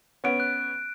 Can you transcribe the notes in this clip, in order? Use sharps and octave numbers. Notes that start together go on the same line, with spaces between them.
B3 C#4 D7
F#6